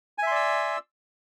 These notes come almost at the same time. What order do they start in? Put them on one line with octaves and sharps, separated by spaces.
G#5 E5 C6 D5 E6